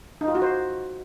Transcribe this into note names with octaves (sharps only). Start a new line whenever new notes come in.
D#4
F4
F#4
C5